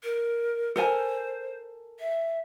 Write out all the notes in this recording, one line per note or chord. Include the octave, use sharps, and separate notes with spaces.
A#4
A4 A#4 C5 G#5
E5